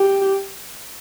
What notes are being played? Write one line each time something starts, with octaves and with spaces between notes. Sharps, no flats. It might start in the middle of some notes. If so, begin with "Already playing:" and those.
Already playing: G4